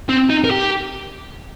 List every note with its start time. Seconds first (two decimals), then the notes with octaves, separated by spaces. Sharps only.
0.09 C4
0.30 D#4
0.44 A#4
0.51 G4